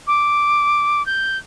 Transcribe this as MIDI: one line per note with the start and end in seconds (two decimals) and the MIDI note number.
0.07 1.05 86
1.06 1.38 91